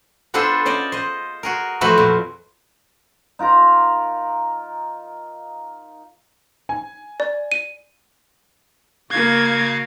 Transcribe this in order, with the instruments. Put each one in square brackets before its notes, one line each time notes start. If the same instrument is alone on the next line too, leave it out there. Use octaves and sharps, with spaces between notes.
[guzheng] B3 D4 F4 G#4 A4 C5
C#4 C5 D5 D#5
C5 D#5
F#4 G#4 A#4
F2 A3 F#4 B4 C5 B5
F2 A#2
[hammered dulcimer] D#4 F4 A#4 A#5
[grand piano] G#5
[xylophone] D5
D#7
[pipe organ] C#3 F#4 F5 [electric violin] A#3 G#6